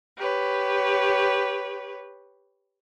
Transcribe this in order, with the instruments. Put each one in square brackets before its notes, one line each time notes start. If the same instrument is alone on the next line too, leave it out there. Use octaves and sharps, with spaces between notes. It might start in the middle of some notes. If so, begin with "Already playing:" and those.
[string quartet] G4 B4 C#5